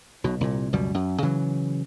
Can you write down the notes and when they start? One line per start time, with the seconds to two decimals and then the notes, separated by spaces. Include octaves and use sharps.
0.24 B1 B2
0.41 C2 A#2
0.72 C#2 F#2 B2 G3
0.94 F#2
1.23 C#3 E3 F#3